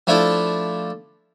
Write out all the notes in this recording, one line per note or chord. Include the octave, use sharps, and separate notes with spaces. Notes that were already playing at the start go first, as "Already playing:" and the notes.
F3 A3 D4 E4